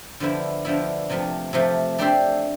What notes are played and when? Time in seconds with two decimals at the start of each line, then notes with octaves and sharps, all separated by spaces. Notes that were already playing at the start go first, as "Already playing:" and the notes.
0.20 D3 F3 B3 E4
0.65 D3 F3 B3 E4
1.10 C3 F3 A3
1.53 C3 F3 A3
1.98 A3 D4 G4 C5 E5